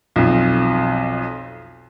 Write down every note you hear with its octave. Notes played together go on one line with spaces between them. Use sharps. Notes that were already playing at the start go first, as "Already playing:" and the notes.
B1 F2